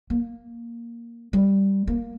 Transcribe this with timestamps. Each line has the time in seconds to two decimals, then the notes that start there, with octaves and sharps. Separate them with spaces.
0.10 A#3
1.33 G3
1.87 A#3